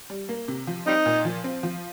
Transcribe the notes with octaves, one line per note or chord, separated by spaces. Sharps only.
G3
A#3
C3
F3
G3 C4 D#4
A#2
F3
C4
F3